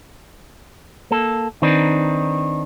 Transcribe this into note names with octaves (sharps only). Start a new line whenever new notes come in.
A#3 A4
D#3 C4 D4 D#4 B4